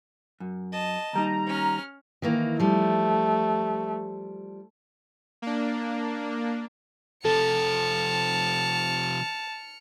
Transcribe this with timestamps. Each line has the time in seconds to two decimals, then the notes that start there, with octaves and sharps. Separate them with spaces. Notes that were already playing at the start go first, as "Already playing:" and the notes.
0.40 F#2
0.73 D#5 A5
1.13 D#2 G3 D#4 A#5
1.47 C#4 F6
2.22 D#3 E3 A#3
2.60 F3 G3 A3
5.42 A#3 D4
7.25 C3 F3 A4 A5 F6 C#7